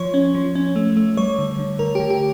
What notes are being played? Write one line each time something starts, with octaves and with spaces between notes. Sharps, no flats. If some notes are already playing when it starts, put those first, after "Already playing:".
Already playing: F3 C#5
C#4
F3
C#4
A3
A3
G3 C#5
D3
D3
D3 A#4
D3 G4
G4